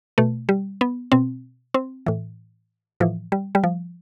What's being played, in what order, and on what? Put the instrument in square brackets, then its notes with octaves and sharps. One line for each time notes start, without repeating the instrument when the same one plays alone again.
[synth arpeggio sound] B2 A3
G3
B3
B2 C4
C4
A2 E3
A2 E3 F3
G3
G3
F3